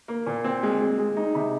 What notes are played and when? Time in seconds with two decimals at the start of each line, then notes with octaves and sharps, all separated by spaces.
0.08 A#3
0.26 A#2
0.44 C4
0.63 G#3
0.81 G#3
0.99 G#3
1.17 D#4
1.35 C3